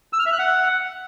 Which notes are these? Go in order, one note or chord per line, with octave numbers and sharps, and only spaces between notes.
E6
F6
E5
F#6
F#5